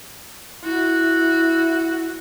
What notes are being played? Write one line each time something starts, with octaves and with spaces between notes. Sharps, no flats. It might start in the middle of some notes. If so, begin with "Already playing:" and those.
E4 F#4